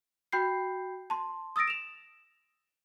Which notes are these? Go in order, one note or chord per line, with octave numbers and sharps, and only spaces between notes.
F#4 G5 B5 G6 C7
A5 C6
D#6 E6 A6 A#6 D7
E7 F7